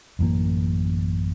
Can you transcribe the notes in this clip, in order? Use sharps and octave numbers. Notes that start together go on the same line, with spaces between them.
A1 F#2 E3 A#3